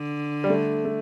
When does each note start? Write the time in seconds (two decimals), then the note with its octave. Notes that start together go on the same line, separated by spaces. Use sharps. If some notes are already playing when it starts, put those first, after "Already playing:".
Already playing: D3
0.44 G3
0.50 A3
0.85 A3